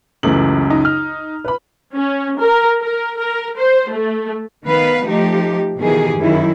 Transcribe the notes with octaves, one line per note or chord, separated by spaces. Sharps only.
C#2 F#2 E3 A3 F#7
D#4
F6
B4 B5
C#4
A#4
A#4
A#4
C5
A3
D#3 B3 B4 F5
F3 A3 D#4 G4
B2 D#3 E3 G4 G#4
F#2 D#3 E4